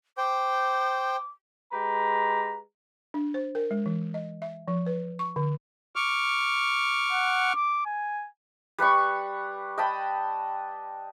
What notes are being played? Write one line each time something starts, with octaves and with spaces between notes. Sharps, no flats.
C5 G5 D6
G#3 G4 B4 A#5
D4
C5
A#4
G#3
E3
D#5
E5
F3
B4
C#6
D3
C#6 D6 F6
F#5
D6
G#5
G3 B4 B5 C#6
D#5 G5 A5 B5